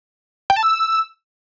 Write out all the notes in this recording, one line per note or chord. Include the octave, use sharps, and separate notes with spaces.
G5
A5
E6